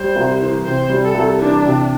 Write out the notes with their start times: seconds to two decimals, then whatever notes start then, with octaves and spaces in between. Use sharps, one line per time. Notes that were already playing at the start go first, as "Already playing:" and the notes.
Already playing: G3 C5
0.16 C2
0.41 E3
0.65 C3 C5
0.89 G3
1.03 A4
1.14 C2
1.39 E3 D4
1.64 C3